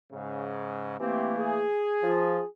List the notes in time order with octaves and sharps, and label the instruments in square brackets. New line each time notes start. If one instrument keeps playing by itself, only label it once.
[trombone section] G#2 C#3
[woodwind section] E3 A3 A#3 [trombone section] C4 G4
[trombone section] G#4
[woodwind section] F3 F4